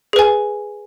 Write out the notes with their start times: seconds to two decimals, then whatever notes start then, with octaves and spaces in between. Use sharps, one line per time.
0.13 G#4
0.16 B4
0.19 G#5